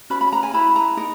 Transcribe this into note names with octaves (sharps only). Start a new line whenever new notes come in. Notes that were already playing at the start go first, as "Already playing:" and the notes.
C#4 F#4 B4 B5
B5
A#5
G#5
E4 B4 B5
A#5
D#4 A#4